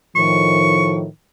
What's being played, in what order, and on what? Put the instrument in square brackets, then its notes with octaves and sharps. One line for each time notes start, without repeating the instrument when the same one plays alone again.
[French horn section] A2 D#3 F3 [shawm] C#6